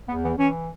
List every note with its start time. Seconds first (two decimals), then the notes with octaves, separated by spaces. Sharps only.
0.08 E2 B3
0.23 E3 B3
0.38 E3 C#4